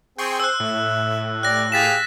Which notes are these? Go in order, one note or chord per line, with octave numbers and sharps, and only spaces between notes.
C4 G#4 G5 C6 C#6
C5 E6 F#6
A2 E5
G4 D5 F#6 A#6
G4 G#4 F5 A6 B6 E7